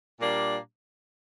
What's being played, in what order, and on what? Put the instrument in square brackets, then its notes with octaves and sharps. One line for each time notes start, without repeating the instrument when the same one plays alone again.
[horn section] A#2 G3 A#3 D4